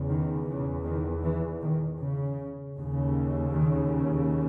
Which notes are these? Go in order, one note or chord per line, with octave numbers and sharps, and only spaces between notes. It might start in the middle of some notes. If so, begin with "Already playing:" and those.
Already playing: E2 C#3
D#3
C#3
D#3
E3
D#3
C#3
D#2 C#3
D#3